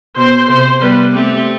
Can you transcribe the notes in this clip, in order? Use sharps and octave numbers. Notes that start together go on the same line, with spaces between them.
B2 C5
C3 C5
G3 B3 B4
A3 C4 G4